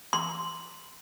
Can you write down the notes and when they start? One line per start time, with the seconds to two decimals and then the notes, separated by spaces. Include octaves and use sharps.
0.13 C6